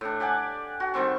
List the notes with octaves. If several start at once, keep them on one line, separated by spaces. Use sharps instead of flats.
A2 D4
G4 D5 F#5 G#5
F#4
D#3 G3 C4 C#6